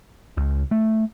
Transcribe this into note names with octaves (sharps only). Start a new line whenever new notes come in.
C#2
A3